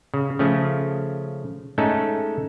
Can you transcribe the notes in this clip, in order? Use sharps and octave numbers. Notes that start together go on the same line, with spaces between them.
C#3
C#3 F3 A3 C#4
G#3 A3 C#4 D#4 A4